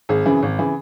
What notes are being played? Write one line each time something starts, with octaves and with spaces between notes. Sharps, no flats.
G#1 G#4
F#2 C#3 E3
G#1
C#3 E3